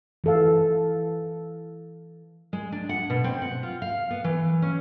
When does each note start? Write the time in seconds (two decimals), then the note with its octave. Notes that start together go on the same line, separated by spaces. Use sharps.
0.24 E3 A4 F5
2.53 G#3
2.72 D4
2.89 F#5
3.10 B2
3.24 C4
3.42 F#5
3.63 F4
3.82 F5
4.10 B3
4.24 E3
4.62 C#4